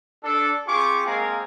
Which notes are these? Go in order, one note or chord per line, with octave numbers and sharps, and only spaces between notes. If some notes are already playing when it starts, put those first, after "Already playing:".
D4 A4
C4 F4 G4 G#4 C#6 D6
G#3 A#3 C4 G#4 A#4 F5